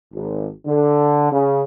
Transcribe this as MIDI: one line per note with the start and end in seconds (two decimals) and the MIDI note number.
0.12 0.47 32
0.65 1.27 50
1.31 1.61 49